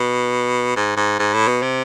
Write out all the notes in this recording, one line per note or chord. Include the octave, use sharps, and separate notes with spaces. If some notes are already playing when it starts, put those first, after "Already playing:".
Already playing: B2
G#2
G#2
G#2
A2
B2
C3